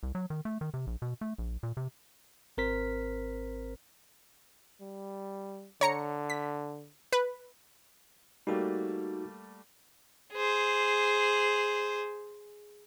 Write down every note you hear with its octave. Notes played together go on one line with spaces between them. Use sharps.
C2
F#3
D#3
A3
D#3
C3
A#1
B2
A3
A#1
A#2
C3
G#1 C4 A#4 C5 F6 B6
G3
D3 C#5 A#5 C#7
B6
B4
G3 A3 A#3 D#4 F#4
G#4 C5